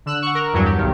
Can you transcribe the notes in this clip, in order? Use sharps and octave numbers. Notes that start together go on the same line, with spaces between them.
D3 E6 F#6
F#5 C#6
A#4
E2 G2 F#3
G4
B1 G2 D#3